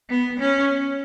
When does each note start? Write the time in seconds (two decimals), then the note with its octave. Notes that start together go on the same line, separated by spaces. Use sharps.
0.10 B3
0.40 C#4